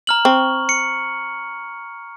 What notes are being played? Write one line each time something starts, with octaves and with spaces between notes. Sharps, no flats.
A#5 F6 F#7
C4 C#6
C#7